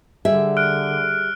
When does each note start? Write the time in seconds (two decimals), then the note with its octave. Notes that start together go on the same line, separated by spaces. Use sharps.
0.25 D3 G3 G#4 E5
0.57 F6 F#6 D7